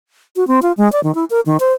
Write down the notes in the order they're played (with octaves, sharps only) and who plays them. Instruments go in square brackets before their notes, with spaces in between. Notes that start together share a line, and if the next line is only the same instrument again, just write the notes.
[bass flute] F#4
C4
F4
G#3
D5
D#3
E4
A#4
D#3
C5